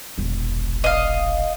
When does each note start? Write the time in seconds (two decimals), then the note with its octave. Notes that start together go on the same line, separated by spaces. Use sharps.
0.18 E1 A#1
0.84 D#5 F5